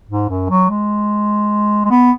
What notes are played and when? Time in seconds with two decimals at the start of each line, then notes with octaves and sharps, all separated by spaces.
0.09 G#2
0.29 F#2
0.50 F#3
0.70 G#3
1.85 G#3
1.91 B3